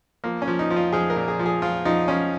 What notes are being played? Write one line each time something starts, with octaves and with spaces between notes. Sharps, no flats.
F3 A#3
C#4
F3
D#4
F3
F4
F3 G#4
A#4
A#2
G#4
F3
G#4
F3 F4
F3 D#4
F3 C#4